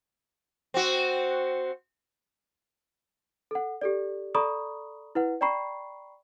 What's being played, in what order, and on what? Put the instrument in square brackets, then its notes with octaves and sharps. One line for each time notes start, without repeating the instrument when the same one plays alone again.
[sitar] C4 F#4
[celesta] A4 F#5
G4 A4 D5
A4 D5 A#5 B5 C#6 D#6
E4 B4 F#5
D5 G5 A#5 B5 C#6 C7